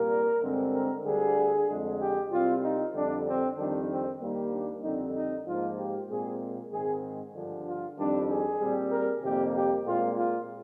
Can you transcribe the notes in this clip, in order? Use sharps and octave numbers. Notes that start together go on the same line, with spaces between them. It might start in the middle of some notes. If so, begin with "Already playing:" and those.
Already playing: C2 A#2 G3 A#3 A#4
G2 D3 G#3 C4
A#4
D2 D3 G3 G#4
F2 D3 G#3
G4
C2 C3 G3 C4 F4
D#4
F2 D3 G3 D4
C4
F2 D#3 G3 C4 D4
C4
D#2 D#3 G3 A#3
D4
F2 D3 G3 C4 D#4
D#4
G#2 F3 A#3 F4
G4
A#2 G#3 C4 G#4
G#2 D#3 G#3 C4 G#4
G2 D3 F3
F4
F2 D#3 G3 C4 D4
G#4
A#2 G3 C4
A#4
F2 C3 D#3 G3 A#3 G4
G4
A#2 G#3 C4 F4
F4